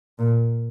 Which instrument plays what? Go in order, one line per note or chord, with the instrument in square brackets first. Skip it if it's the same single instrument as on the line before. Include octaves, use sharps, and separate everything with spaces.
[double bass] A#2